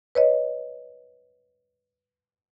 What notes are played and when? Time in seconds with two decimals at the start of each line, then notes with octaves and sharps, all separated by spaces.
0.15 B4 C#5 D#5